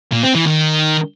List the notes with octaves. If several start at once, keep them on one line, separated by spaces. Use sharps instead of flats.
A#2
C4
E3
D#3